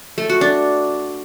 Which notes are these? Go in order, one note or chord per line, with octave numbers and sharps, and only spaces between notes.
A3
F#4
D4